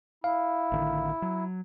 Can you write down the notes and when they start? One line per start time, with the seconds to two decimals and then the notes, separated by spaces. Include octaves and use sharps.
0.24 E4 F5
0.72 A1 D3 D#3
1.22 F#3